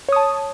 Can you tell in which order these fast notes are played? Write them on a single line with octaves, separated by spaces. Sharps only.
C#5 D#6 A5